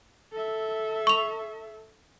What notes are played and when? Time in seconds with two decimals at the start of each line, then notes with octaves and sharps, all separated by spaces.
0.32 A4 E5
1.07 C#6 F7